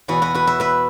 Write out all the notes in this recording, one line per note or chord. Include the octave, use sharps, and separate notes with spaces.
E2 B2 F#4 B4
F#4 B4
F#4 B4
B4 E5
B4 E5